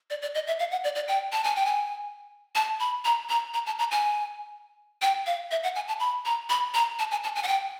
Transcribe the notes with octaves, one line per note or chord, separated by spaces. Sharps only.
D5
D5
D#5
E5
F5
F#5
D5
D5
G5
A5
G#5
G5
G#5
A5
B5
A#5
A#5
A#5
A5
A#5
G#5
G5
F5
E5
F#5
G#5
A5
B5
A#5
B5
A#5
A5
G#5
A5
G#5
F#5
G5